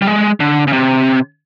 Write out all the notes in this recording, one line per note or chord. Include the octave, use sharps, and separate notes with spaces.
G3
G#3
D3
C#3
C3